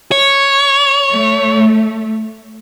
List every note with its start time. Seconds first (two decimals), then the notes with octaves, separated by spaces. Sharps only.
0.12 C#5
1.13 A3